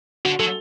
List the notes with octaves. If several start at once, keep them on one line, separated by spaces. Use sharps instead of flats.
D3 F#4
F#3 A4